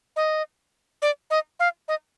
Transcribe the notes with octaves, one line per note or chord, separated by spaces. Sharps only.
D#5
D5
D#5
F5
D#5